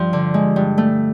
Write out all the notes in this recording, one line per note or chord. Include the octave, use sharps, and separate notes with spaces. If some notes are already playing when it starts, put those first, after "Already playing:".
Already playing: G2 F3
D3
G#3
G2
A3